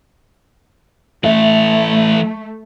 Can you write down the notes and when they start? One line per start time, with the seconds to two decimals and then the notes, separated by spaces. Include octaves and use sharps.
1.24 E3 A3 A4 E5